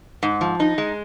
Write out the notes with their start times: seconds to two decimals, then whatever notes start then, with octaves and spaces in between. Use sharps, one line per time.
0.23 G#2
0.41 F3
0.60 D#4
0.78 G#3